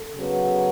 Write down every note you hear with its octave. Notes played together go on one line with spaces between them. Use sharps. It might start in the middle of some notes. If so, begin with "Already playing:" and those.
Already playing: A4
C#3 F#3 B3